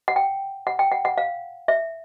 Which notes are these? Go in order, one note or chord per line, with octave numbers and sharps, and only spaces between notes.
F#5
G5
F#5
G5
F#5
F#5
F5
E5